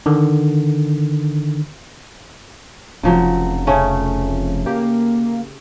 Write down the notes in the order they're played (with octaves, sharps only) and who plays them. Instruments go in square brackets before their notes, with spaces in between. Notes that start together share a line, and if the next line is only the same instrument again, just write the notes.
[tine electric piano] D3 D#3
[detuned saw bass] F1 [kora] C#3 F3 F#3
[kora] C#3 A3 C#4
[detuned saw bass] A#3 [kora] G4